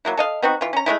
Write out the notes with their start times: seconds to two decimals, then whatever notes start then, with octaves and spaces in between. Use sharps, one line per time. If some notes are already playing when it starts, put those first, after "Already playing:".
0.05 F#3 A#3 E4
0.17 A4 D#5 F5
0.43 B3 C4 D#4 F#4
0.61 E3 F4
0.73 C#4 A#5
0.86 G#3 A3 B3 E4